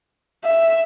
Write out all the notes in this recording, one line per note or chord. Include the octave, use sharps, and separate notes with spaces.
E5